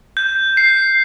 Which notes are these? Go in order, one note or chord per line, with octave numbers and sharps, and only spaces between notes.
G6
C7